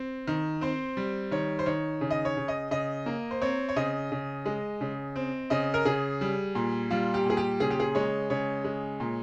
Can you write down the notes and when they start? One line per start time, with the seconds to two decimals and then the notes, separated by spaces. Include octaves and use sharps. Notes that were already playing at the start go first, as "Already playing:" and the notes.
Already playing: C4
0.27 D#3
0.61 C4 C5
0.97 G3
1.31 D#3 C#5
1.59 C5
1.66 D#3 C#5
2.01 C#3
2.11 D#5
2.25 C#5
2.37 C#3
2.48 D#5
2.71 C#3 D#5
3.06 A#3
3.31 C5
3.42 C4 C#5
3.69 C#5
3.76 C#3 D#5
4.12 C#3
4.46 G#3
4.81 C#3
5.16 C4
5.50 C#3 D#5
5.74 A#4
5.85 C#3 G#4
6.21 G3
6.55 A#2
6.90 G3 F4
7.14 G4
7.26 A#2 G#4
7.37 G4
7.60 C#3 G#4
7.70 G4
7.80 G#4
7.95 G#3 C#5
8.30 C#3 C#5
8.64 G#3
9.00 A#2